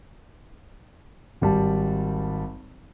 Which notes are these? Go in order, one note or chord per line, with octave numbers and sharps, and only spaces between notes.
G#1 G3 A5